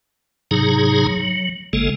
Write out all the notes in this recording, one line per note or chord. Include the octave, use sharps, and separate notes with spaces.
G#2 C3 F#3 D#4 G#4 A#5
F#3
G#1 C#3 G#3 A#3 A4